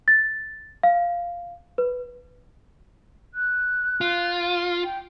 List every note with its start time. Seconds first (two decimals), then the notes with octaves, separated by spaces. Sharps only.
0.08 A6
0.83 F5
1.78 B4
3.34 F#6
4.01 F4
4.84 G5